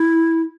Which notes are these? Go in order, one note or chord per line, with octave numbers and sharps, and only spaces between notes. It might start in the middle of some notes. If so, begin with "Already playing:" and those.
Already playing: E4